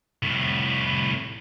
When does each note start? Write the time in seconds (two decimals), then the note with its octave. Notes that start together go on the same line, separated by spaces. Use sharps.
0.23 C2 A2